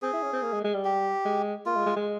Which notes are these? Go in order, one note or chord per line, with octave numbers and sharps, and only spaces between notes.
C4 G#4
E4
C#4
C4
A#3
G#3
G#3
G3
G4
G#3
A#3 F4
G#3
G#3
G#3